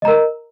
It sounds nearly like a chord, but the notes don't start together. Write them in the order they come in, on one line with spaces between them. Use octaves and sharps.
D#5 A#5 A#4